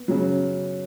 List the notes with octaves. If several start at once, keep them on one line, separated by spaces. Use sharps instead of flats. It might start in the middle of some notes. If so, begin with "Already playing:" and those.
Already playing: B3
C#3 F#3